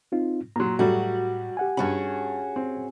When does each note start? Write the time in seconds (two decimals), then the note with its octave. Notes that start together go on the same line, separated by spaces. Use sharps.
0.12 C4 D#4 F4
0.56 A#2 F#3 A#5 C6
0.79 A2 F#3 G3 A3 F#4
1.57 G4 F#5 G#5
1.77 G2 C#4 F#4 G#4 B5
2.56 C4